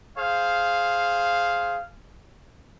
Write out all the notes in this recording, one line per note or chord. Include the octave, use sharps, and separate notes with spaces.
G#4 C5 F5